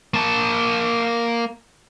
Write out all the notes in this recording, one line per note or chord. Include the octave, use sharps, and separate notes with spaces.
A#3 A5